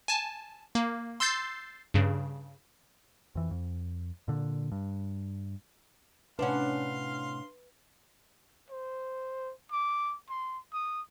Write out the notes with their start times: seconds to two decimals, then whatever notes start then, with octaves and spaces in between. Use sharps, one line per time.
0.08 G#5 A5
0.75 A#3
1.20 C6 E6 G6 A6 C7
1.94 G2 C#3
3.35 F2 E3
3.51 F2
4.28 A#2 D3
4.72 G2
6.39 A2 C3 C#4 D4 B4 F5 F#5 C6
8.70 C5
9.71 D6
10.30 C6
10.74 D#6